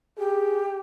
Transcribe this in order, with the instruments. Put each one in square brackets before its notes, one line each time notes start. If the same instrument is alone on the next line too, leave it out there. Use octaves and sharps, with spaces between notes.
[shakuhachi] G4 [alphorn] G#4